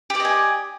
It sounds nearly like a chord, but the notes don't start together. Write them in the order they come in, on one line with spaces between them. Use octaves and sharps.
G4 D5 D#5 G#5